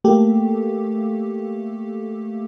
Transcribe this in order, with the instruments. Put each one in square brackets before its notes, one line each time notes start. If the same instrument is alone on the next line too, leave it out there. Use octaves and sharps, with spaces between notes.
[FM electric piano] A3 A#3 G4 A4